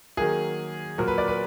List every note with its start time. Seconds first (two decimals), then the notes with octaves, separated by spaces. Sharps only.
0.17 D#3 F#3 A#3 G#4
0.98 A#2 F#3 A#3 A#4
1.08 B4
1.18 D5
1.28 B4